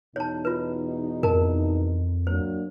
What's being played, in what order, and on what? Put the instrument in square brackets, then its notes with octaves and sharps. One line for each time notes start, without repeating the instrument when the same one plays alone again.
[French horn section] E2 B2 D#4 [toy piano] C#5 A5
[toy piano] F4 B4
[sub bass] F2 [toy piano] A#4 A5
[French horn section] F#3 A#3 D4 [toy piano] C5